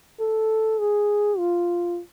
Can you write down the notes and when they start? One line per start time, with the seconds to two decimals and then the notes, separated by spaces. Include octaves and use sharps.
0.20 A4
0.79 G#4
1.38 F4